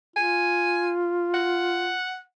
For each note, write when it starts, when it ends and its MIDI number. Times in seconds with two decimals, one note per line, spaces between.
0.16 1.95 65
0.16 0.93 80
1.34 2.20 78